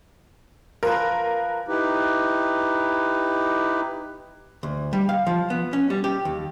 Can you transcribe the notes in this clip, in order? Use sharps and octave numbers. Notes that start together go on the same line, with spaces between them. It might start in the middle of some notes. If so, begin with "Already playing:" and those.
F3 A#4 B4
D#4 E4 G4 B4
D2
G3
F5
F3
B3
C#4
G3
G4
D#2